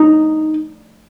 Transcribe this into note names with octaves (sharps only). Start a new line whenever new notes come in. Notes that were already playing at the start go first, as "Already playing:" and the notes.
Already playing: D#4